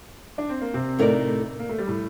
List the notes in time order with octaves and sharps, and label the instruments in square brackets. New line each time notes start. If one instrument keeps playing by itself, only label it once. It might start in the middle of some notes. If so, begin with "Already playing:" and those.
[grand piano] D4
C4
A#3
C3 C4
[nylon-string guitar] A2 A3 D#4 A#4 D5
[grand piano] A#3
A3
G3
A2 A3